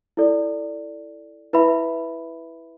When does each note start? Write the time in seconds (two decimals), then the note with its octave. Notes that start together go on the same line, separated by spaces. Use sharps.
0.17 E4 A4 D5
1.53 E4 B4 E5 B5